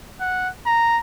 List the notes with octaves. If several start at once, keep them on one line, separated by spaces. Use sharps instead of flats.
F#5
A#5